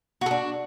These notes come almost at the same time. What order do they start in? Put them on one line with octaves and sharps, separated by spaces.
F#4 A4 D4